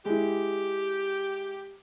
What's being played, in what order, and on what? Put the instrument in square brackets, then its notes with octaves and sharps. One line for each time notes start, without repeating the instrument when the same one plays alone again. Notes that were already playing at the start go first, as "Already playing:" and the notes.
[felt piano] G#3 E4 [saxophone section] G4